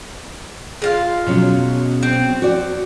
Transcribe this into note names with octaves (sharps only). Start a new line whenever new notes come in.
G#3 F4 F5
B2 F#3 C#4
C4
F#4 D5